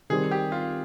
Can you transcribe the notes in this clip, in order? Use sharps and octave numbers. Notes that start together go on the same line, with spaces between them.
D#3 G3 C4 G#4
G4
F4